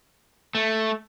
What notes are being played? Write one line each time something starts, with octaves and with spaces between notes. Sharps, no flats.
A3